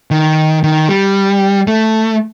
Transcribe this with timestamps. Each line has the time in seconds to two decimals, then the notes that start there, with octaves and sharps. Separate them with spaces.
0.11 D#3
0.63 D#3
0.89 G3
1.67 A3